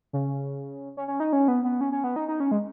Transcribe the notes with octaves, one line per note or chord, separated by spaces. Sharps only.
C#3
C#4
C#4
D#4
C#4
B3
B3
C#4
C#4
B3
D#4
D#4
C#4
G#3